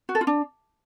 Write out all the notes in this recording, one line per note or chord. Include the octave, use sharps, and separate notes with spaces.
F#4
A4
F4
D4